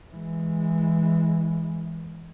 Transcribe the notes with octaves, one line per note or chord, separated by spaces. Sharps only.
E3 G#3